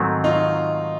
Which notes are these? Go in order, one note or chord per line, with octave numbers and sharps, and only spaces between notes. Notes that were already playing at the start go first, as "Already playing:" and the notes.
Already playing: G#2 D#3 F#3 A3 C4
D#4 F4